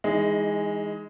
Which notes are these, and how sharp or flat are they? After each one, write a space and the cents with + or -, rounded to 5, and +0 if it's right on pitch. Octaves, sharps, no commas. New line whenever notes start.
E3 +0 G#3 -10 D#4 +20